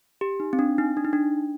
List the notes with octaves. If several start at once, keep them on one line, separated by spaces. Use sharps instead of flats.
G4
D#4
C4
D4
D#4
D4
D#4
D4